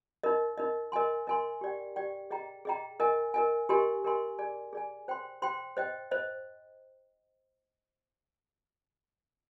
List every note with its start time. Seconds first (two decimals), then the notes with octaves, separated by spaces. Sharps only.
0.23 D#4 A#4 D#5
0.58 D#4 A#4 D#5
0.92 A#4 D#5 G#5 C6
1.27 A#4 D#5 G#5 C6
1.61 G4 D5 G5
1.96 G4 D5 G5
2.30 G#4 D#5 G5 A#5
2.65 G#4 D#5 G5 A#5
3.00 A#4 D#5 G#5
3.34 A#4 D#5 G#5
3.69 G4 A#4 D#5 G#5 C6
4.04 G4 A#4 D#5 G#5 C6
4.39 G#4 D5 G#5
4.73 G#4 D5 G#5
5.08 C5 G5 C6
5.42 C5 G5 C6
5.77 C5 D#5 G5
6.11 C5 D#5